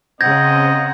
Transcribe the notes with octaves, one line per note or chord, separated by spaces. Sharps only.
C#3 C4 D#5 F#5 A#5 G6 G#6 A#6